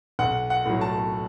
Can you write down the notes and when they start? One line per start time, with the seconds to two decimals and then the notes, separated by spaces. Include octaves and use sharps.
0.19 B1 F#5
0.50 F#5
0.66 A2 F#3
0.81 A5